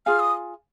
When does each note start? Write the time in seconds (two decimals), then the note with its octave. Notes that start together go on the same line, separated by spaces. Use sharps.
0.06 F4 G#4 F5 G#5 F6
0.19 D#6